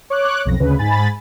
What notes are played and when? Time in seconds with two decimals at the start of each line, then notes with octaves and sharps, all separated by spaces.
0.10 C#5 D6 F#6
0.45 B1 F2 A#6
0.60 D2 C#3 B4
0.79 G#2 G#5 B5 A6